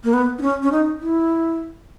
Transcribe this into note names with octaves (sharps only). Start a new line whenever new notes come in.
A#3
B3
D#4
C#4
C#4
D#4
E4